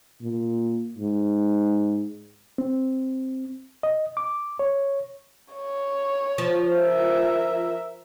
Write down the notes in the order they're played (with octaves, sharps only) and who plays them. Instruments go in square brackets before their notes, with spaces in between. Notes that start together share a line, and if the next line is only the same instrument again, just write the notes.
[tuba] A#2
G#2
[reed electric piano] C4
D#5
D6
C#5
[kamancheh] C#5
[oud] F3
[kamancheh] A#4 E5